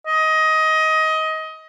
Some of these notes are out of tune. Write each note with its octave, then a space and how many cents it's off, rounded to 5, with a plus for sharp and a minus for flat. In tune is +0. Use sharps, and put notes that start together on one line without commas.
D#5 +20